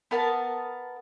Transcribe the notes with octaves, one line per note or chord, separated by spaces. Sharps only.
B3 A#4 F#5 A5